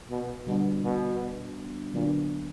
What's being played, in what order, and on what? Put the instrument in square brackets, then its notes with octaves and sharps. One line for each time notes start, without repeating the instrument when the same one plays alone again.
[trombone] B2
[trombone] B2 [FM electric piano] D3 G3 B3 D4 F#4
[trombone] B2
[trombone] A#2 [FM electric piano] D3 F#3 B3 D4